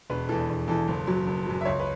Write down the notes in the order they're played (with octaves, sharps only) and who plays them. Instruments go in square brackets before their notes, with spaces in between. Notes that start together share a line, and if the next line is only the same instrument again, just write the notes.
[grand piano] E1 B4
E2 E3 A4
E1
E2 E3 A4
F#1
F#2 F#3
F#1
F#2 F#3
E5
C#2 C#5
B4